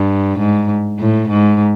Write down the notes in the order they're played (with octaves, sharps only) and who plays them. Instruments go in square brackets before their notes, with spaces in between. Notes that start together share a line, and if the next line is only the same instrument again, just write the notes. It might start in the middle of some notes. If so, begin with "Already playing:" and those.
Already playing: [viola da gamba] G2
G#2
A2
G#2